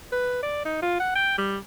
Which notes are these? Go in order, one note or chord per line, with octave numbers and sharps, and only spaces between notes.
B4
D5
D#4
F4
F#5
G5
G3